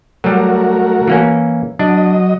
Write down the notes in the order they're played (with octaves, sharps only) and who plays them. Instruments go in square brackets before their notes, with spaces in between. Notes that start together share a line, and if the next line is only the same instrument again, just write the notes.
[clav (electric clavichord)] F#3 G3 [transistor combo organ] A3 F#4 A#4
[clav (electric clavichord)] E3 A#3 C#4
[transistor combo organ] F#3 D#5 [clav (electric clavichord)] D4